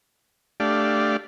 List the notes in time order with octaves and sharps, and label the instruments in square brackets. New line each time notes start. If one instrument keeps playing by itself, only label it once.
[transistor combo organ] A3 D4 G4 D5 F5